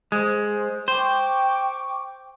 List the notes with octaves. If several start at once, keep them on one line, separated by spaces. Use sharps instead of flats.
G#3 C5
C5 G5 C#6 D6